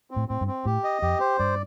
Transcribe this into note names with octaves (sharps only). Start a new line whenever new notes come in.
C4
A2
A2 C4
G2
C4
A2 G4
D#5
F2 G4
C5
G2 D5